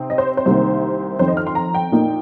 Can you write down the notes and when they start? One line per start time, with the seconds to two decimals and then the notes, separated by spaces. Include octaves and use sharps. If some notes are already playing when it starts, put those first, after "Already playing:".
Already playing: C3 C4 D#4
0.10 D#5
0.18 C5
0.37 C5
0.45 C2 C3 D#3 A#3
1.19 F2 D#3 C4 C5
1.28 D#5
1.37 F6
1.47 C6
1.55 A#5
1.74 G5
1.92 A#2 A#3 D#4